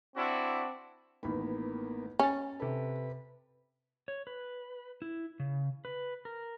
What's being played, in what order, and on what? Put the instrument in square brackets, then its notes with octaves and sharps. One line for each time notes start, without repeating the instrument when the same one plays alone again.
[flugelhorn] C4 [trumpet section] D4 E4 F#4
[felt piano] A1 D#3 B5 [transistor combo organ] A#3 B3
[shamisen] C#4 [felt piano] G#5 A6
[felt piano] C3 A4 [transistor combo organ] B4
[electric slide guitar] C#5
B4
E4
C#3
B4
A#4